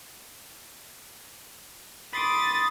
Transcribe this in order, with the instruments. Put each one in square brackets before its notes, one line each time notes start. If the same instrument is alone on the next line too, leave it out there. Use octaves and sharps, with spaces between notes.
[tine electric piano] B5 C6 D6 [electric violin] D#6 A6